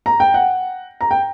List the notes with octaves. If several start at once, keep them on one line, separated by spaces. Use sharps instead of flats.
A#5
G5
F#5
A#5
G5